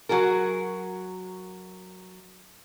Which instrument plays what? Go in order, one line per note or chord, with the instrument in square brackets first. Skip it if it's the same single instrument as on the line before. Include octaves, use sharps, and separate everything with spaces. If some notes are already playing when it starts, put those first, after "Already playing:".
[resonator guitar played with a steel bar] F#3 F#4 G#4 A#4